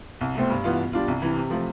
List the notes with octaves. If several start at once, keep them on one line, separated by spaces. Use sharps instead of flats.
C2
B2 A3 C4
G2
E3 B3 F4
B2
G3 D4 F4
C2
C3 E3
C3
F3 A3